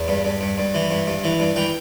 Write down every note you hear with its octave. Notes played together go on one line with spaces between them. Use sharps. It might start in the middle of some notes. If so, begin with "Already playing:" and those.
Already playing: E2
G2
G2
G2
G2
E3
G2
G2
E3
G2
E3 G5